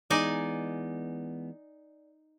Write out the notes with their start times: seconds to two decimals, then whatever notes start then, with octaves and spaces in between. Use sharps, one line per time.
0.10 E3 G#3 B3 D#4 D5 G#5